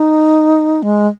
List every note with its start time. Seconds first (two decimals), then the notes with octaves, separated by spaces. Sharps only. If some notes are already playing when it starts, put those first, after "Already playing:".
Already playing: D#4
0.83 G#3